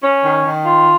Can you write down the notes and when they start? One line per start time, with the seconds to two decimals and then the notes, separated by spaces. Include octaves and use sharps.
0.03 C#4
0.25 D#3
0.45 D#3
0.65 F4